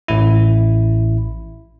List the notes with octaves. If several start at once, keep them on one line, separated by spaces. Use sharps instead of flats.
A1 E4